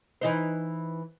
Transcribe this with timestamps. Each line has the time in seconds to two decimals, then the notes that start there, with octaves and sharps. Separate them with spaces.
0.21 E3 D#4 C5